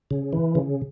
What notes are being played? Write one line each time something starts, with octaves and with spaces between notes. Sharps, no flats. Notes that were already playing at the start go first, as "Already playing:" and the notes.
C#3
E3
C#3